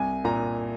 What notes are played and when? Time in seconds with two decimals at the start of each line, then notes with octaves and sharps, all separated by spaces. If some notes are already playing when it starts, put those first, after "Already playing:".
Already playing: C2 G#5
0.24 A#2 A#5